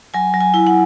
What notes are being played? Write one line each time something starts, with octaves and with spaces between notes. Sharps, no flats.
F#3 G#5
F#3
G#5
E4
F#5